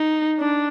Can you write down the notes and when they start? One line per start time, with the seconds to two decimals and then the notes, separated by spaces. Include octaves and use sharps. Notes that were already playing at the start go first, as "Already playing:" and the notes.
Already playing: D#4
0.40 D4